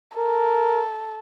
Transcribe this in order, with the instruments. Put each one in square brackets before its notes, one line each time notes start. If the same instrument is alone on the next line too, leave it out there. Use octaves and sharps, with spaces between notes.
[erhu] A4 [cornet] A#4